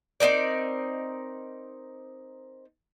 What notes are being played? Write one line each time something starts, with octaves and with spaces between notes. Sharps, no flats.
C4 D#4 A#4 D5